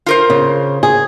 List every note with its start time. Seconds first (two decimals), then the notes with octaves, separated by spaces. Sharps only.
0.06 F4 A#4 C5
0.30 C#3
0.83 G#4